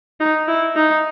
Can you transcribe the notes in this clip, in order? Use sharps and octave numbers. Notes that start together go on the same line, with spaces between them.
D#4
E4
D#4